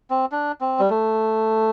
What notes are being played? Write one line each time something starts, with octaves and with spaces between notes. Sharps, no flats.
C4
D4
C4
G3
A3